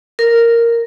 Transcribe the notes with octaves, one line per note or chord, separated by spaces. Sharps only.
A#4